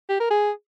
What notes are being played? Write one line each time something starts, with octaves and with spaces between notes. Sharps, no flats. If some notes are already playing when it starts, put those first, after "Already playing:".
G4
A#4
G#4